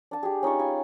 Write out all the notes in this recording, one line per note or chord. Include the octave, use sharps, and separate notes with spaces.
D4 A5
G4 G#4
C#4 D#4 F4 C#6
F4 D#5 G#5 B5